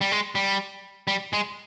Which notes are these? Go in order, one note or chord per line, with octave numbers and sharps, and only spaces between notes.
G3
G#3
G3
G3
G#3